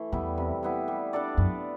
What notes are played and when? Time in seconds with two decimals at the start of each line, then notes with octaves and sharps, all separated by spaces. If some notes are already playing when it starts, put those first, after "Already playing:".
Already playing: E3 A3
0.12 E2 G3 B3 E4
0.38 C3
0.63 G3 B3 E4
0.88 G3
1.13 D4 A4 D5
1.37 F#2 B3